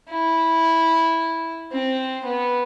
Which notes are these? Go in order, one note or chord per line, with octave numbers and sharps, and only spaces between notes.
E4
C4
B3